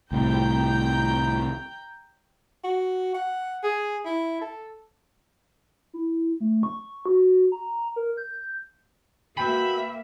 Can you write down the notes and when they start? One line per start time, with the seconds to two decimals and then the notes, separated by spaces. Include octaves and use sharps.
0.12 C2 A2 G5 A#5 G6
2.64 F#4
3.14 F#5
3.63 G#4
4.05 E4
4.41 A4
5.94 E4
6.40 A3
6.63 C#6
7.06 F#4
7.52 A#5
7.96 A#4
8.17 G6
9.37 A#3 F#4 B4 E5 G5 B5